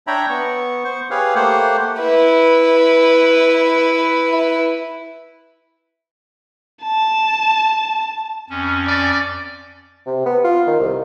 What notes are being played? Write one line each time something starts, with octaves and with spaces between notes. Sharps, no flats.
D4 C#5 E5 G5 A#5 B5
B3 C#6
C5 C#6
G4 G#4 B4 C#5 F5
A3 A#3 G4 C5 F#5
E4 B4
A5
F2 C#4
D5 A6
C3
B3
F4
D#3
C2